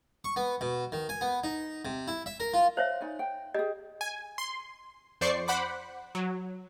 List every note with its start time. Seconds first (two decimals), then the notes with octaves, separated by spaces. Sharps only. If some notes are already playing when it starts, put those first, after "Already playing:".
0.24 C#6
0.36 B3
0.61 B2
0.92 D#3
1.09 G#5
1.21 B3
1.44 D#4
1.85 C3
2.08 E4
2.26 E5
2.40 A#4
2.54 F4
2.77 C5 C#5 E5 F5
3.01 D#4 D5 G#5
3.19 G5
3.54 G4 G#4 D#5
4.01 G#5
4.38 C6
5.21 F2 C5 D5 C#6 C7
5.48 C5 F#5 B5 D6
6.15 F#3